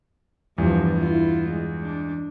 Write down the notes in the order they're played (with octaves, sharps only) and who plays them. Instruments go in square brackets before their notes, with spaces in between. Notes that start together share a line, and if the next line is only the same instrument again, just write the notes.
[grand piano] E2 [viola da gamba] G2 F3
[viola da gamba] E4 F4
G#3
D4